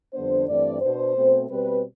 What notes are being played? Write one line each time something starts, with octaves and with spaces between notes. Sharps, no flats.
F2 D3 G3 B3 D4 C5
G2 E3 A3 C4 D5
B2 B3 D4 C5
B2 A3 C4
B2 G3 C4 B4